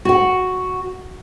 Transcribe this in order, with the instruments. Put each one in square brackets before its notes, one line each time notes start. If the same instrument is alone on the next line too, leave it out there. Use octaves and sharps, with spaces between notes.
[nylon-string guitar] F#4 F#5